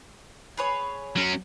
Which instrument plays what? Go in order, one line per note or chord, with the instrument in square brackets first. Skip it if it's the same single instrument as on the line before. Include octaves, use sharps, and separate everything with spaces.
[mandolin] G#4 B4 C#5
[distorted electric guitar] F#3 C#4